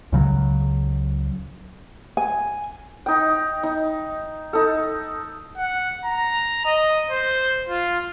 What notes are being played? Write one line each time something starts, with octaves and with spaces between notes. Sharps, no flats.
C#2 C#3 F#3
G#5
D#4 G5
D#4
D#4 A4
F#5
A#5
D#5
C5
F4